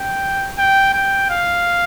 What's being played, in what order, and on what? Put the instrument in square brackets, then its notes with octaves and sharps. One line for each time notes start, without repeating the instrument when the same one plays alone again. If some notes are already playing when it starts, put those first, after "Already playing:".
Already playing: [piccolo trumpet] G5
G5
G5
F5